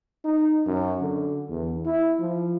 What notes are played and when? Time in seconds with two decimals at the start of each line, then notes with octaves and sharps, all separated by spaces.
0.25 D#4
0.66 F#2
1.00 D3
1.49 E2
1.85 E4
2.20 F3